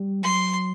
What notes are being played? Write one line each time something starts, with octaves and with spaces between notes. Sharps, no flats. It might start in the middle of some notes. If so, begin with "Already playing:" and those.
Already playing: G3
F#3 C6